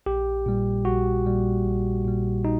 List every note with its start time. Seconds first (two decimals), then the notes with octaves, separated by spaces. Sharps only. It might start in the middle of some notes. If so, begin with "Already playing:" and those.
0.06 A#1 G4
0.46 A#2 G3
0.85 A#1 F#4
1.25 A#2 G3
1.65 A#1
2.05 A#2 G3
2.45 D#4